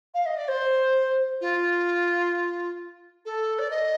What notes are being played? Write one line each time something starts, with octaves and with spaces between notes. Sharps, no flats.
F5
D#5
D5
C5
F4
A4
D5
D#5